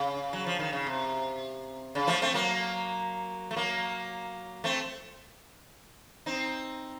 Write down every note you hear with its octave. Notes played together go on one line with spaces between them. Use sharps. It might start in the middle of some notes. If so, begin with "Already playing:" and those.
Already playing: C#3
F#3
F3
D#3
C#3
C3
C#3
F3 A3
A3 C4
F#3 A#3
A3
F#3 A#3
A3 C4
C4 D#4